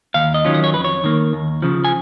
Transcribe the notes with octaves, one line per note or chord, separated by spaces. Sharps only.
D#2 F5
D#5
D#3 F#3 C#4 F4
D#5
C#5
F2 B4
C#5
D#3 A#3
D#2
C#3 F3
G#5